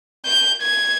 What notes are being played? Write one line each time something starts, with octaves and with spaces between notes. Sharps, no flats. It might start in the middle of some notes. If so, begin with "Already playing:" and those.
G6
G#6